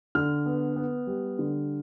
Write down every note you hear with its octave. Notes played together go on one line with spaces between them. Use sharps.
D3 F6
B3
B3
G3
D3